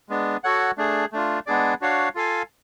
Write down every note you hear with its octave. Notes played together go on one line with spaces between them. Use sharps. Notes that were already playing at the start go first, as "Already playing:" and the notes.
G#3 B3 D4
F#4 A4 C#5 F#5
A3 D4 G#4
A3 D4 F4
G#3 B3 D4 G#4 D5
D4 F#4 C#5 F5
F4 A4 F5 G#5